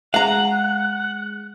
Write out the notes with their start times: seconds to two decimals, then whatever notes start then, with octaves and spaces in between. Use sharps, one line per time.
0.14 G#3 F5 F#5 A#5 F#6